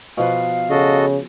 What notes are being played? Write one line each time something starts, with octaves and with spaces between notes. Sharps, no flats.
B2 F3 B4 F5
C#3 F#4 A4 D#5